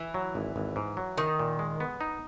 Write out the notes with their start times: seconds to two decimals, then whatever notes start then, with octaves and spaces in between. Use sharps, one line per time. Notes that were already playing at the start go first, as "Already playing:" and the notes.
Already playing: E3
0.14 F#3
0.35 G#1
0.56 G#1
0.76 G#2
0.97 F#3
1.17 D#3 D#4
1.39 A#2
1.59 G#3
1.80 B3
2.01 D#4